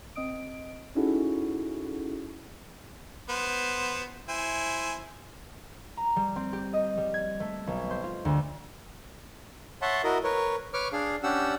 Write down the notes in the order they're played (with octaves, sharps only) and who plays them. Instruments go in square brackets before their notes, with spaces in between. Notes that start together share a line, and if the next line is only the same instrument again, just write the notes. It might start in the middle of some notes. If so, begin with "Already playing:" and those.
[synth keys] C4 D#5 D#6 D7
C#4 D#4 E4 F#4 G#4 A4
[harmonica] B3 C5
E4 C5 G#5
[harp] A#5
G3
C4
G4
D#5
G3
G#6
A3
B1
C5
F4
D2
[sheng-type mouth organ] C#5 E5 F#5 A5 C6
E4 F#4 A#4 D#5
A#4 B4 C#5
B4 C#5 C#6 D6 F6
D4 G#4 F5
C#4 D4 G4 F#5 E6